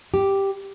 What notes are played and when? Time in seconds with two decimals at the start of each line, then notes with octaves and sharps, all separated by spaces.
0.14 G4